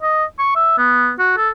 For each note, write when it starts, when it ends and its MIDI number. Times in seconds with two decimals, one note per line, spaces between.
0.03 0.24 75
0.39 0.53 85
0.56 0.76 76
0.78 1.11 59
1.19 1.34 66
1.37 1.50 69